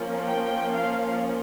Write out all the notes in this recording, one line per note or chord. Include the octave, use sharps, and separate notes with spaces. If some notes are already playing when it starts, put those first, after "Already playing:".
Already playing: F3 A#3 C#4
G5
F5